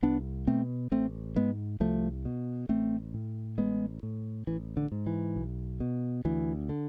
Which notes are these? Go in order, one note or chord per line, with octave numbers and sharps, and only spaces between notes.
C2 B3 D4
B2 A3 C4
A1 A3 C4
G#2 G#3 B3
C2 F3 A3
B2
A1 A3 C4
A2
A1 G#3 B3
A2
A1 E3
D3
G#2
E3
B1
B2
D2 E3
D3